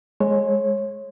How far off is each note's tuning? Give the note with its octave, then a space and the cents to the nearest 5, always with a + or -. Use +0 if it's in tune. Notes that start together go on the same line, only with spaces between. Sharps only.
G#3 +10 C#5 -25